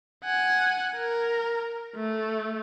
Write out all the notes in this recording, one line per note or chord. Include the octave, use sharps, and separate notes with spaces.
F#5 G#5
A#4
A3